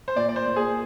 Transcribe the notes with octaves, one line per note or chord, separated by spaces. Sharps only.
C5
A#2 D5
D5
C5
A#2
G#4